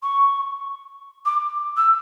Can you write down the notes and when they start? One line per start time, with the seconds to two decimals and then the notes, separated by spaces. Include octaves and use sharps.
0.02 C#6
1.25 D6
1.76 E6